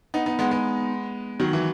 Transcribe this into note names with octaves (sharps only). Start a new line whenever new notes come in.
B3 D#4
B3 D#4
G#3 B3
G#3 B3
D#3 F#3
E3